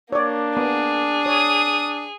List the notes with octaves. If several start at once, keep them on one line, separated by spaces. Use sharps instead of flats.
A#3 D4 C#5 D5
B3 G#4
C#5 D#6